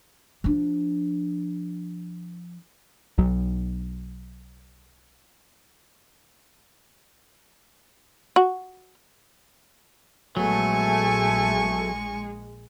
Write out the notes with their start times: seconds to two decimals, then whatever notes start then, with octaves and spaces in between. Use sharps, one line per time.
0.44 F3 D4
3.18 B1 F#3
8.36 F#4
10.37 A#1 F#3 G#3 A3 B3 G#5 C#6